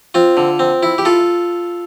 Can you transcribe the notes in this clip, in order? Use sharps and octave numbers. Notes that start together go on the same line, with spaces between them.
C4 F4
D3
C4
E4
G4
F4 A4